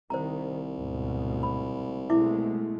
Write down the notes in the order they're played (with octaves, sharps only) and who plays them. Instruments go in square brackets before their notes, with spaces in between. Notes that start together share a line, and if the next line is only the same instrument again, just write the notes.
[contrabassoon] C2 [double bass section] D#3 [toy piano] C5 A#5
[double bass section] D2 G#2 B2
[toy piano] B5
[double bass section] B2 G#3 A3 [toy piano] E4 E5 D6